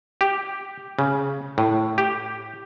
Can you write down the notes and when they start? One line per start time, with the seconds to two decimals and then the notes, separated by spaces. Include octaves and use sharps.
0.21 G4
0.99 C#3
1.58 A2
1.98 G4